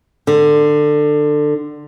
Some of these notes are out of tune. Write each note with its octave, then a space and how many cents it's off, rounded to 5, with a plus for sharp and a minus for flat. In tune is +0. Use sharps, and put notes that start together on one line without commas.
D3 +20